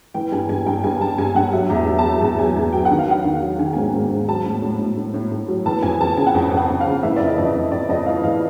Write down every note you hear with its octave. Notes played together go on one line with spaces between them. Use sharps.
E3 G5
G2 G#5
G2 G#5
G2 G5
G2 G#5
G2 A5
G2 G#5
G2 F#5
F#3 E5
E2
E5
E2
A5
F#3
E2 A5
F#3 G#5
E2 G#5
F#3 G5
F#5
D#3
F5
F#3 F#5
D#3
F#3
D#3 G#5
G5
G#2 G#5
G#2
G#2
F#3 A5
A2
A2
A2
A2
A2
A2
F#3
E3 A5
F2 G#5
F2 A5
C#3 G#5
F#5
F2 G5
F2
F#5
F2
F5
C#3
E3 E5
F2 D5
D#5
F2
F2
F2 D5
F2 D#5
E3 F5
E3 F5